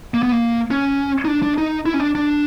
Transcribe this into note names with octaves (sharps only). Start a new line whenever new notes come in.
A#3
B3
A#3
C#4
D#4
D4
D4
D#4
E4
C#4
D4
D4